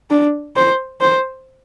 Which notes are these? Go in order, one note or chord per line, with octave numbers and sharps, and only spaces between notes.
D4
C5
C5